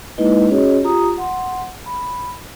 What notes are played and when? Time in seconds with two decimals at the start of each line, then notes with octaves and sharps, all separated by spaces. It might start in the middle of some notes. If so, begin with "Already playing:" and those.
0.18 G#3 A#3 D#4 E4 B4 D#5
0.49 C#4 F#4 G#4 C#5 D#5
0.83 F4 G4 A#5 D#6
1.18 F#5 C6
1.86 B5